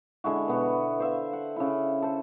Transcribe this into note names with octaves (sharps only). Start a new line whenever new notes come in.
D3 G#3 E4 F#4
B2 B3 F#4
C5 E5 F5
F#5
C#3 E4
A4 C5